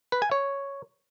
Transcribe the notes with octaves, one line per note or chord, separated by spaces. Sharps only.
B4
G#5
C#5